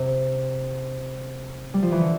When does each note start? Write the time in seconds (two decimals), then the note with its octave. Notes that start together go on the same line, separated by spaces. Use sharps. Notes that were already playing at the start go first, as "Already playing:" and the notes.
Already playing: C3
1.74 G3
1.82 F3
1.92 E3
2.01 D3